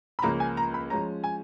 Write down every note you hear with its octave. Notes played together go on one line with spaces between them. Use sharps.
B5
C#2 C#3 F3 A#3 C#4 A#5
G#5
A#5
B5
F3 G#3 C#4 A#5
G#5